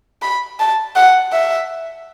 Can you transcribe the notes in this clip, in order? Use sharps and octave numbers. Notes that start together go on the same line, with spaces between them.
B5
A5
F#5
E5